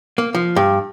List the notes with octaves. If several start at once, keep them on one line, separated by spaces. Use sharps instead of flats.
A#3
F3
G2